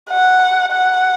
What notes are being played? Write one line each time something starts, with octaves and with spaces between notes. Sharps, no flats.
F#5
F#5